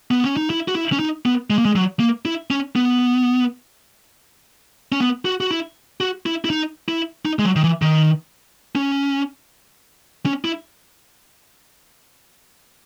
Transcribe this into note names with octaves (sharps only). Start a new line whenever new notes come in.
B3
C#4
D#4
E4
F#4
E4
C#4
D#4
B3
G#3
A#3
G#3
F#3
A#3
E4
C#4
B3
C#4
B3
F#4
F#4
E4
F#4
E4
E4
D#4
E4
D#4
G#3
F#3
D#3
E3
D#3
C#4
C#4
E4